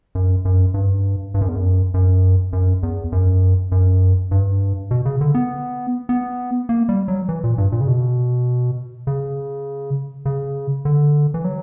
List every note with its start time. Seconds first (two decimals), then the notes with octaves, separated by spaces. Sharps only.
0.15 F#2
0.45 F#2
0.74 G2
1.34 G2
1.41 F#2
1.48 E2
1.56 F#2
1.94 F#2
2.53 F#2
2.83 E2
3.12 F#2
3.72 F#2
4.31 G2
4.91 B2
5.06 C#3
5.21 D3
5.35 B3
6.09 B3
6.69 A#3
6.89 G3
7.08 F#3
7.29 E3
7.44 A#2
7.58 G2
7.72 A#2
7.81 C#3
7.88 B2
9.07 C#3
10.26 C#3
10.85 D3
11.34 E3
11.45 F#3